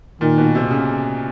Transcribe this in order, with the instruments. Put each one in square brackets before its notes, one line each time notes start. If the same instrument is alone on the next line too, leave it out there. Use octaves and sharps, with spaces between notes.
[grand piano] A#2 [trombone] D#3
[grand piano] B2
C3
C#3